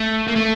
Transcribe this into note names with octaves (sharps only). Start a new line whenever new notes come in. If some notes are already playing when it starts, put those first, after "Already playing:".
Already playing: A3
A#3
A3